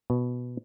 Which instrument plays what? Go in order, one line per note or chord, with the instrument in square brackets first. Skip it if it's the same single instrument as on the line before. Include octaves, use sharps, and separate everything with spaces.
[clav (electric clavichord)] B2